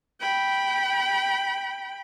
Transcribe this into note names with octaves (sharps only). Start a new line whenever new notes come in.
G5 B5